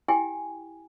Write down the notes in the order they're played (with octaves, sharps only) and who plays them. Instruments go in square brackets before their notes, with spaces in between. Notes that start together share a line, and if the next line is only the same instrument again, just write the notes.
[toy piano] E4 G4 G5 G#5